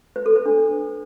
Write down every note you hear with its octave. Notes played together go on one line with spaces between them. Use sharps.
B4
A4
B4
D4